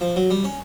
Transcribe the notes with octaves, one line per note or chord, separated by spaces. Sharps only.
F3
F#3
G3
C#4